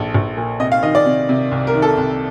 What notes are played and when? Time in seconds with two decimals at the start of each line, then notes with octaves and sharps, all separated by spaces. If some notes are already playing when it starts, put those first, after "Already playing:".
Already playing: A#1 A4
0.14 A#1
0.37 A#2
0.60 C3 D#5
0.72 F5
0.83 D#3 D#5
0.95 D5
1.06 C3
1.29 C3
1.52 C2
1.67 A#4
1.74 D#3
1.82 A4
1.97 C2